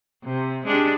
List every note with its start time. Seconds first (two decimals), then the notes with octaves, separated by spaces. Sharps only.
0.24 C3
0.65 G#3 D4 G4